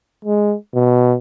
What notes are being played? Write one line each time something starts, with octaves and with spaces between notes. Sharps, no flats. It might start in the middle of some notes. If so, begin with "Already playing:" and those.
G#3
B2